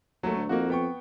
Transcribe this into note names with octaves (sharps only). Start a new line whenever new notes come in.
D#2 F#3 A3
D2
F2 A#3 D#4 F#4
B3 G5 C#6